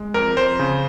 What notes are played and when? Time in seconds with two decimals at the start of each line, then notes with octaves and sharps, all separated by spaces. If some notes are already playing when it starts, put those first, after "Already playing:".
Already playing: G#3
0.14 F2 A#4
0.37 F2 C5
0.59 C#3